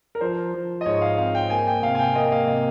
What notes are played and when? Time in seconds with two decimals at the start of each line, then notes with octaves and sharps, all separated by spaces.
0.15 A#4
0.21 F3 C5
0.54 F3
0.81 D#5
0.86 G#2 C#5
1.01 F5
1.18 C4 F5
1.35 G5
1.50 A#3 G#5
1.67 G5
1.82 C3 F5
1.95 G#5
1.99 G5
2.15 A#3 D#5
2.32 F5
2.47 C3 D#5